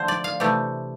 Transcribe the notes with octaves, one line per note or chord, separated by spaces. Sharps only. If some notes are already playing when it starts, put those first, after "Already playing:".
Already playing: D3 F3 A3 D4 C5
D5
F5
C3 E3 A3 G4